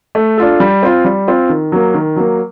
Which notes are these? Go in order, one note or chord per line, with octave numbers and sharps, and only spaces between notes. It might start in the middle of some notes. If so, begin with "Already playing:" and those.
A3
D4 F4 A4
G3
C4 F4
G3
C4 F4
D#3
F#3 A#3
D#3
F#3 A#3